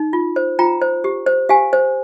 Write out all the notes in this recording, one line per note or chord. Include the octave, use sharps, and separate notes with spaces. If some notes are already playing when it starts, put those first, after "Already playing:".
Already playing: D#4
F4
C5
F4 G5 A#5
C5
G4
C5
G4 F5 G#5
C5